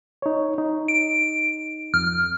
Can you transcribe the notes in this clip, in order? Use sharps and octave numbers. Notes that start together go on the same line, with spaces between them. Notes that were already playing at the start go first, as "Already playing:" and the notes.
D#4 C#5
D#4
D7
F2 F6